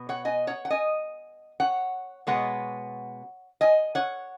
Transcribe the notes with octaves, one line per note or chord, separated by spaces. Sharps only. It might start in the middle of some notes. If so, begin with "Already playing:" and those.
Already playing: B2 B3
C#5 F#5
D#5 G#5
C#5 F#5
F#5
D#5 G#5
C#5 F#5
B2 G#3 B3 C#5 F#5
D#5 G#5
C#5 F#5